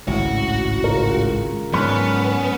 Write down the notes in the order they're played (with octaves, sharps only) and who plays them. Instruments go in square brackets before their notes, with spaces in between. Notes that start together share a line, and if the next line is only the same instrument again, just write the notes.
[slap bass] G#1 C#2 [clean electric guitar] A2 [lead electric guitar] F#4
[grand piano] C#3 F4 A#4
[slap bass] G#2 F#3 [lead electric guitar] B3 [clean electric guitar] C#4 D4 B4